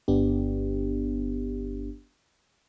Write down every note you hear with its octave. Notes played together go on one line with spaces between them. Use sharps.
G1 B3 D4 G4